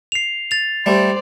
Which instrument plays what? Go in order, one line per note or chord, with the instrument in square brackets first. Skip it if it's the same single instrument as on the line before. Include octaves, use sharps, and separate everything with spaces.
[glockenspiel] C7 F7
A6 F7
[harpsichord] G3 A3 [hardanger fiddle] C5 D5